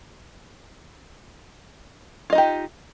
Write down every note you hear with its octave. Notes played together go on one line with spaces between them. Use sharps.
D#4 F4 G4 D#5